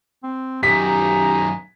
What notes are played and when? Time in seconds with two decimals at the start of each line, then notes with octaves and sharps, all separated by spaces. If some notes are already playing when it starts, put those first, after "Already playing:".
0.24 C4
0.63 F#2 D#3 G4 D#5 G#5 A#5 B6